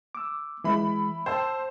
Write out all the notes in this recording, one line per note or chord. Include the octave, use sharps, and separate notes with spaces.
D6 E6
E3 G#3 E4 B5
C5 G5 A5 E6